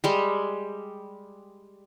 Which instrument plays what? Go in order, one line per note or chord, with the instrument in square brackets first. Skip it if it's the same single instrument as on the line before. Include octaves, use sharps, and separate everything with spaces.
[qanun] G3 G#3